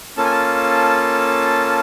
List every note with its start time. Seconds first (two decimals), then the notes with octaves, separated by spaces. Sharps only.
0.17 A#3 C#4 F4 A4 A5
0.25 G#5
0.31 A5